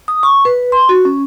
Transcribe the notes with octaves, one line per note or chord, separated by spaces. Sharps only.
D#6
C#6
B4
C6
F#4
C#4